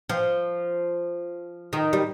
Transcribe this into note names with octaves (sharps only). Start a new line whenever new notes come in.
F3
D#3
G3